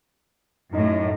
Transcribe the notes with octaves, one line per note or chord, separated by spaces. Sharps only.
F#2 A2 D#4 D#5